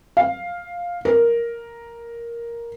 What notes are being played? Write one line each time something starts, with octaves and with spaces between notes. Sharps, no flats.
F5
A#4